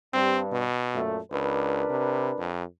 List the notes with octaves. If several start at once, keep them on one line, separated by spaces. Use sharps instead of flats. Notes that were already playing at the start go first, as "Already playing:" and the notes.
G2 C4
B2
F#2 A#2 A3
C#2 D4 A#4 B4
C3
F2